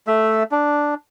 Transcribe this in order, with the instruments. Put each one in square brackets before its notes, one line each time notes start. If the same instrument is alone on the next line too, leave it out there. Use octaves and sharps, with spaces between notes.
[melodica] A3 E5
D4